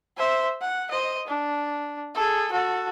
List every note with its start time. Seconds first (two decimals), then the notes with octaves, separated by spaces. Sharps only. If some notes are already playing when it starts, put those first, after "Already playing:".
0.17 C5 E5
0.61 F#5
0.91 C5 D#5
1.27 D4
2.14 G#4 A4
2.52 F#4 A4